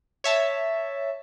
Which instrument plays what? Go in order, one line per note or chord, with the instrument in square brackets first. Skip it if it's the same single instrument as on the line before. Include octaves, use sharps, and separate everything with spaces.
[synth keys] C#5 E5 A5